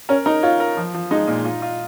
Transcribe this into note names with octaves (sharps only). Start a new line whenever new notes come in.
C#4 A#4
D#4 A#4
F4 C#5
A#4
F3
F3
G#3 D#4
A#2
F4
F4